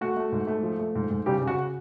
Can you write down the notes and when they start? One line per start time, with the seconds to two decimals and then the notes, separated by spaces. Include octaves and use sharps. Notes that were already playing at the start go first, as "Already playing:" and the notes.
0.01 A3 F#4
0.17 A3
0.32 G#2
0.47 A3
0.63 F3
0.79 A3
0.95 G#2
1.10 G#2
1.26 C#3 G3 G4
1.42 C#3
1.47 F#4